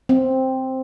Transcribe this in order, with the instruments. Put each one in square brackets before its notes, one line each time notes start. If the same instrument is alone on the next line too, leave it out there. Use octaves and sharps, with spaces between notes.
[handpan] C4